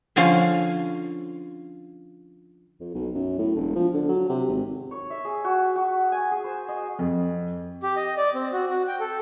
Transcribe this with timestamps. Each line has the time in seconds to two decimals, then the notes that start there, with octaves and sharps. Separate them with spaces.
0.16 D3 F3 C#4 F5
2.80 F2
2.95 B1
3.15 F#2
3.39 A2
3.56 E1
3.76 F3
3.94 D3
4.09 F#3
4.29 C3
4.49 G#1
4.91 C#5
5.10 E5
5.25 G#4
5.44 F#4
5.76 F#4
6.12 G#5
6.32 G#4
6.44 C5
6.68 D#5
6.99 F2
7.83 G4
7.97 D#5
8.17 D5
8.35 C4
8.53 F#4
8.69 F#4
8.88 G5
9.00 A4